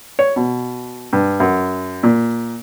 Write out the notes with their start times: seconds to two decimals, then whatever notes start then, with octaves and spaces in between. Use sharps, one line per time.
0.19 C#5
0.36 B2
1.13 G2
1.40 F#2
2.03 A#2